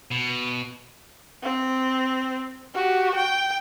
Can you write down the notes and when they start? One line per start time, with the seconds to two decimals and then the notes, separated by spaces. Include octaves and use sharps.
0.11 B2
1.43 C4
2.74 F#4 G4
3.15 G5